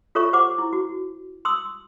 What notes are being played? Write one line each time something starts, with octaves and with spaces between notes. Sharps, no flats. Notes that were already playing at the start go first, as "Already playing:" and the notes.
F4 A4 C#5 E5 C#6
G4 C5 F#5 D6
E4
F#4
C6 D#6 E6